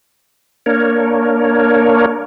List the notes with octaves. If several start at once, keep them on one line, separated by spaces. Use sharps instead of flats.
A#3 D4 A#4 C#5